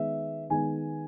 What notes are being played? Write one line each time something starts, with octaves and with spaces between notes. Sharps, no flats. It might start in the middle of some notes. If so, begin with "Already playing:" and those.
Already playing: D#3 G#3 B3 D#4 E5
D#3 G#3 B3 D#4 G#5